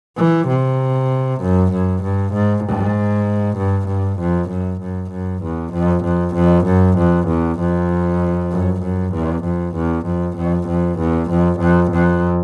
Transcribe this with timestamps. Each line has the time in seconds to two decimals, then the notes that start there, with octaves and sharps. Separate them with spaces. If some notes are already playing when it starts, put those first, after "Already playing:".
0.17 E3
0.48 C3
1.42 F#2
1.72 F#2
2.03 G2
2.33 G#2
2.64 G#2
3.57 G2
3.88 G2
4.19 F2
4.49 F#2
4.81 F#2
5.11 F#2
5.43 E2
5.73 F2
6.04 F2
6.35 F2
6.66 F#2
6.98 F2
7.28 E2
7.59 F2
8.51 F#2
8.82 F#2
9.13 E2
9.44 F2
9.75 E2
10.06 F2
10.37 F2
10.68 F2
10.99 E2
11.30 F2
11.60 F2
11.91 F2